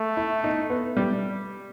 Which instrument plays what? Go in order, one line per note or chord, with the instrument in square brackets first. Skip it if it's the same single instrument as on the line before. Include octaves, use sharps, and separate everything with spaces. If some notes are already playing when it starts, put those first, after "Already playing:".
Already playing: [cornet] A3
[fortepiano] E4
D#4
B3
G3